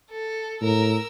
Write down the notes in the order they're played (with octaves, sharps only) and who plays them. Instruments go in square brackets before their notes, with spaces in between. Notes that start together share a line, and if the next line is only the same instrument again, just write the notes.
[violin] A4
[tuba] A2 [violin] A#4 E6